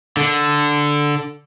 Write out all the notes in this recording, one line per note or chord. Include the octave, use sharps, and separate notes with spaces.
D3